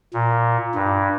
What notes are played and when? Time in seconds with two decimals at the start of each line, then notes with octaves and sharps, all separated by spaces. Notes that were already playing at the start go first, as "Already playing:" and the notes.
0.14 A#2
0.75 G2